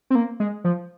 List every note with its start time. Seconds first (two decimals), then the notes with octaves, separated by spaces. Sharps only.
0.10 C4
0.15 A#3
0.40 G#3
0.64 F3